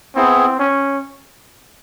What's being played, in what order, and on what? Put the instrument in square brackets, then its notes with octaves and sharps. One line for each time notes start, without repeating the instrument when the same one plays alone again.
[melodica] B3 E4 G#4 [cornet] C4
[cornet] C#4